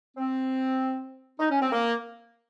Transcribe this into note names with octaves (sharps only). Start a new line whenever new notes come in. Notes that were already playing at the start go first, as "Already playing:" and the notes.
C4
D#4
C#4
C4
A#3